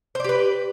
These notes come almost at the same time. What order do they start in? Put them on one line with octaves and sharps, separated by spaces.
C5 D5 G4 B4